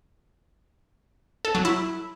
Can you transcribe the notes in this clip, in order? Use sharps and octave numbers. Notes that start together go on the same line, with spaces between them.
A4
F#3
E4